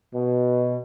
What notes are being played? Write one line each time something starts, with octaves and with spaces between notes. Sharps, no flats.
B2